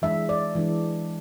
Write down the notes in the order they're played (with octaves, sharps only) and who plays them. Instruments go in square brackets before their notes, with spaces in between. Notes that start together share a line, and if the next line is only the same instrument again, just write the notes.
[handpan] E3 G#3 D4 E5
D5
E3 G#3 D4